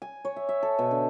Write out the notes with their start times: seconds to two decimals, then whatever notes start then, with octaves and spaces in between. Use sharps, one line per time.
0.02 G#5
0.25 C#5
0.36 E5
0.49 E5
0.63 A4
0.79 B2
0.91 D3